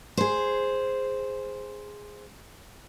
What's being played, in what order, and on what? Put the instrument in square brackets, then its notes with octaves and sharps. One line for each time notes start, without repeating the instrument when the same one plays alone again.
[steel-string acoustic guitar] G#4 C5